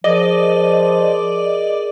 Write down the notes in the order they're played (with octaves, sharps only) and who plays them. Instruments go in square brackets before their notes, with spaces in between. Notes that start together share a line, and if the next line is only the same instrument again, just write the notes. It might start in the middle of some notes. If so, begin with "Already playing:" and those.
[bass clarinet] F3 [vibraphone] G#4 A#4 [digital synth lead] D5 [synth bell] D#5